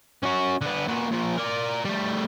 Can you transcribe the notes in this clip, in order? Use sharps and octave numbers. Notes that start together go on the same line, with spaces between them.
C#4 F#4
D3 B3
A#2 F#4
A#2 F3
A#4 D5
G3 A3